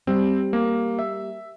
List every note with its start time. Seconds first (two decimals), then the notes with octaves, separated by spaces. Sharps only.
0.07 G3 C4
0.53 A#3
0.99 E5